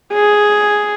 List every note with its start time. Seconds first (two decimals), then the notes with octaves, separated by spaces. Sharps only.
0.13 G#4